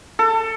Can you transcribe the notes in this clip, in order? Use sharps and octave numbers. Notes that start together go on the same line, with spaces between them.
A4